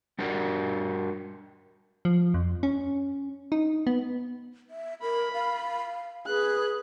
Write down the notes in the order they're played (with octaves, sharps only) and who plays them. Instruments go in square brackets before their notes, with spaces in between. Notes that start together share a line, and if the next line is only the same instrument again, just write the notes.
[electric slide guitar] G3 D4 F#4 G4 A#4 D5
[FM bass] F3
F2
C#4
D#4
B3
[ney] E5
[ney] A#4 [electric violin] B5
[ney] F5
[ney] G#4 [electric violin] B4 F#6